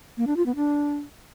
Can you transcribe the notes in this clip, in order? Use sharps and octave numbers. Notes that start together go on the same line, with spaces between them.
A#3
D4
F4
B3
D4